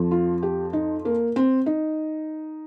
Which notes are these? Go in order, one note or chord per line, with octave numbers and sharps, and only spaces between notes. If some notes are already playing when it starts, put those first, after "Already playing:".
Already playing: F2 F3
F4
G4
D#4
A#3
C4
D#4